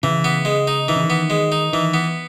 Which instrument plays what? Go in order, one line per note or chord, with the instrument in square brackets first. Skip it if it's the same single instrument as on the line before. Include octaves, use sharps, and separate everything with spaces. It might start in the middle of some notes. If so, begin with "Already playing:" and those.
[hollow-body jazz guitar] C#3 [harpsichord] E3
[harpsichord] B3
G#3
D#4
[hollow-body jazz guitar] D#3 [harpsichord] E3
[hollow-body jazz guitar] C#3
D#3
[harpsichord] B3
G#3
D#4
[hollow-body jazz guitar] D#3 [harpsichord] E3
[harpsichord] B3